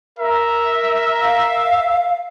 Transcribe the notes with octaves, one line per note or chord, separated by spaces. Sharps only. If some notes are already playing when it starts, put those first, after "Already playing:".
A#4 E5 A#5
F5